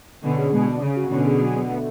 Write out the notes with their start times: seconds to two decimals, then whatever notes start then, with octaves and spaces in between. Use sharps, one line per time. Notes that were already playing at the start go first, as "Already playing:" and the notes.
0.23 B2 D3 C#4
0.38 G#4
0.53 B2 G#3
0.67 D4
0.81 C#3 C#4
0.96 F#4
1.11 B2 D3 C#4
1.26 G#4
1.40 F#3
1.56 B3
1.70 A3